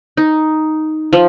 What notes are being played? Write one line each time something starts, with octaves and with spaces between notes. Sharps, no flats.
D#4
F3